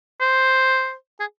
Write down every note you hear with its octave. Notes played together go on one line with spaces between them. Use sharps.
C5
G#4